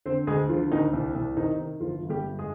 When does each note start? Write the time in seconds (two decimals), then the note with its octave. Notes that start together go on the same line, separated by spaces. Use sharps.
0.06 D3 C4 C5
0.27 D2 G#3 G#4
0.49 D3 F3 F4
0.72 D2 D#3 D#4
0.93 C2
1.15 C2
1.37 C3 D#3 D#4
1.58 D#3
1.80 G1 F3 F4
2.02 G1
2.10 G3 G4
2.24 G2
2.39 G#3 G#4